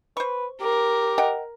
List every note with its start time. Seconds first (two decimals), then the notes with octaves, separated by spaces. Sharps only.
0.17 B4 C5 C#6
0.61 G4 A#4
1.18 D#5 F#5 G5